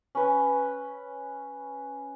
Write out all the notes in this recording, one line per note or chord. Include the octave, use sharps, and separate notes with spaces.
C#4 B4